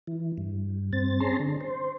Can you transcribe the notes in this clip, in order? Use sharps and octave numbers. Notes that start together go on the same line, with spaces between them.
E3
G2
G2 C4 A6
C4 C#4 G#4 A5 A#5 C6
D3
C5